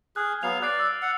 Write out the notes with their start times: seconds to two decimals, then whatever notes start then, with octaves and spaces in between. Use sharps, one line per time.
0.16 G#4 F6 F#6
0.43 F#3 B3 F5 F7
0.62 D5 F#6 A6 C7
0.79 E6 F#6
1.02 F#5